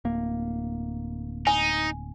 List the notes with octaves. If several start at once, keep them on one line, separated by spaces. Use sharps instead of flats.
D1 A#3
D#4 G#5